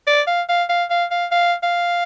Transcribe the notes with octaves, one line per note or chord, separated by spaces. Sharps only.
D5
F5
F5
F5
F5
F5
F5
F5